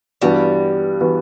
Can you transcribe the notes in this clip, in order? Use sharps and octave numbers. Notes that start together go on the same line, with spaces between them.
G2 E3 G3 B3 F#4
E3 B3 F#4